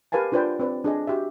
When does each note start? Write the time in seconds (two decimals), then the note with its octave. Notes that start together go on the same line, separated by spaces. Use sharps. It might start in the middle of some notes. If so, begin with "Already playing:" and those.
0.12 G4 A#4 B4 F5 G#5 A5
0.32 D4 F4 B4 C5 D5 G5
0.59 C4 B4 D5
0.84 D4 G#4 D#5
1.07 F#4 G4 E5